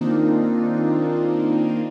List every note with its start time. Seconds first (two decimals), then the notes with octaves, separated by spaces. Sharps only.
0.01 D#3 A#3 C4 D4 D#4 F4